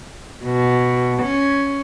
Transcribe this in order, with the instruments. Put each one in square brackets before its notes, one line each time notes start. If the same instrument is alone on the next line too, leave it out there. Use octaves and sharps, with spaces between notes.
[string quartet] B2
C#4